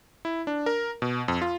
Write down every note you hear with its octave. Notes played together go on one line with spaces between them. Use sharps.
E4
D4
A#4
B2
F2
F4